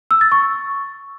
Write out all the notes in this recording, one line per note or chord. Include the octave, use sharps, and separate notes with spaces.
E6
A6
C#6